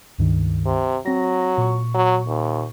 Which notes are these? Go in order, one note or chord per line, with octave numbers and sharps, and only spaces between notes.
C#2 G2 D#3
C3
F#3 C4 A#6
A#2 C#6
F#3
D#2